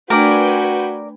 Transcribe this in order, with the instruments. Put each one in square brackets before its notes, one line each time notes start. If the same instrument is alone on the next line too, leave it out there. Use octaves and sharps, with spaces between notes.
[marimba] A3 D4 [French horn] F#4 [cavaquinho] A#4 D5 [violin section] B4 G5 G#5